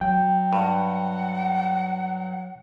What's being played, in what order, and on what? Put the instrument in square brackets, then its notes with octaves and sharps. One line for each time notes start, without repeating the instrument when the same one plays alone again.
[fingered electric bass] F#3 [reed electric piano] G5
[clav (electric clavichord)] G2 [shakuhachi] F#5